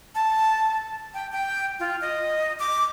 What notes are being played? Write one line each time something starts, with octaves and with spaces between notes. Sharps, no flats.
A5
G5
G5
F4
D#5
D6